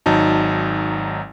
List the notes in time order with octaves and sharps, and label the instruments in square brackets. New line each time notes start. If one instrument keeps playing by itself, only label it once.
[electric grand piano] G#1 F#3 D#4 A5